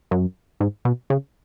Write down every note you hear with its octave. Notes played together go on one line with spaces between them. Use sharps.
F#2
G#2
B2
C#3